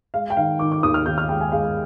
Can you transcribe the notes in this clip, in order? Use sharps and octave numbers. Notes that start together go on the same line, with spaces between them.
G#3 F5
G5
D#3 F5
D#3 D6
D6
D#2 D#6
F6
D#2 G6
F6
G#3 G5
G#5
G#3 F5